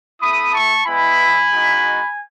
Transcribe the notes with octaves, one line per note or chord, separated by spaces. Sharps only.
A3 E4 B5 D#6
A5 C#6
G#3 B3 E4 G#5 B5
G#3 D#4 F#4